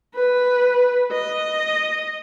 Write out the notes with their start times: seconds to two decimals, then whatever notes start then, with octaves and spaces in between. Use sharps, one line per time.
0.15 B4
1.12 D#5